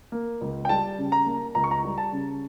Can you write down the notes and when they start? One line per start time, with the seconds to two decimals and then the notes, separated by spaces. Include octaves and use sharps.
0.12 A#3
0.41 C#2
0.65 G5
0.69 G3 A5
0.98 C#3
1.12 A#5
1.26 A#3
1.55 C#2 A#5
1.64 C#6
1.71 A#5
1.84 G3
1.98 A5
2.12 C#3